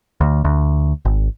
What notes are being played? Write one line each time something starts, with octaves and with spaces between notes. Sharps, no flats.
D2
D2
G#1